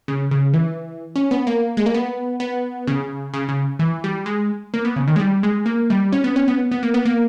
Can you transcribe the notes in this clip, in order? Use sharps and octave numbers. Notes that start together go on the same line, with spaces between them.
C#3
C#3
E3
C#4
B3
A#3
G#3
A#3
B3
B3
C#3
C#3
C#3
E3
G3
G#3
A#3
B3
C#3
D#3
G#3
G3
G#3
A#3
G3
C#4
B3
C#4
B3
B3
A#3
B3
A#3